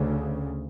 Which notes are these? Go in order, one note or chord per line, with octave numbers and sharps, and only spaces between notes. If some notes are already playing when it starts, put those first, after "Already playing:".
Already playing: D2 C#3